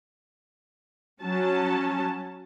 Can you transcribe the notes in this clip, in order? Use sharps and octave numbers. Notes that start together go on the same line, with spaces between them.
F#3 C#4 A5